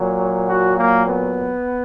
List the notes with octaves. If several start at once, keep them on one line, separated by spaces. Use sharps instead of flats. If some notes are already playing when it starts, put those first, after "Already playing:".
Already playing: A#2 F#3
F#4
A#3
B3